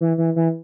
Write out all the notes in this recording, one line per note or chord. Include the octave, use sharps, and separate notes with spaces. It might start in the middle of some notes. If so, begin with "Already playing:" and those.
E3
E3
E3